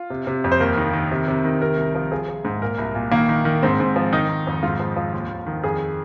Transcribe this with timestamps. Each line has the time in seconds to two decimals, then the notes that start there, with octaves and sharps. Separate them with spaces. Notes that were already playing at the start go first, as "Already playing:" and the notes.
Already playing: F4
0.10 C3
0.27 C3
0.44 F2
0.52 C5
0.60 D#2 A#4
0.77 D#3
0.93 D#3
1.11 C3
1.28 C3
1.45 D#3
1.62 C3 A#4
1.77 C2
1.95 F3
2.11 F3 G#4
2.28 F3
2.45 G#2
2.62 A#2 A#4
2.78 C2
2.95 A#2
3.12 D#3 A#3
3.29 D#3
3.45 D#3
3.63 G#2 C4
3.80 G#2
3.96 F3
4.13 D#3 D#4
4.29 D#3
4.47 F2
4.63 G#2 F4
4.80 F3
4.96 F3
5.13 D#2
5.30 D#2
5.46 D#3
5.64 F2 G#4